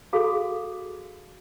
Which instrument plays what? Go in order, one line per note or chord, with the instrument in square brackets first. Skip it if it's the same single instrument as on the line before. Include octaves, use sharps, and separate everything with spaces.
[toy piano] F#4 G#4 A4 F5